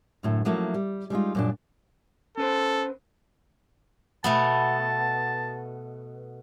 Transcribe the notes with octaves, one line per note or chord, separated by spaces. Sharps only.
F#2 A2 D3
F3 F#3 A3 A#3 C#4 E4
G3
G3 G#3 D#4 F4
F#2 A#2 D4
C#4 A4 B4 C5
B2 A3 B3 A5